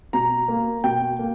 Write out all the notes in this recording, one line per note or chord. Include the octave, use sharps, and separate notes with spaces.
B2 A#5
A#3
B2 G5
A#3